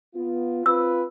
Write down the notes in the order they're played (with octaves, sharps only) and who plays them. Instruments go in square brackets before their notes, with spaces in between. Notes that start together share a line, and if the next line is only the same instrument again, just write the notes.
[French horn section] B3 F4
[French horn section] C4 F4 [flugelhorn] B4 [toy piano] E6